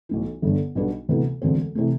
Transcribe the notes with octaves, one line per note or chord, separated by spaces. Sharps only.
B1 A2 E3
G1 G2 D3
B1 B2 G3 B3 D4
D2 C3 E3 B3
E1 D2 D3 A3 C4
C3 E3 A3